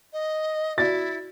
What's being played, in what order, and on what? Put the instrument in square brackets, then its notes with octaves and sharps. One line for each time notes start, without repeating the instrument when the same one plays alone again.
[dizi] D#5
[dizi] E4 [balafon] F#4 D5 [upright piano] A6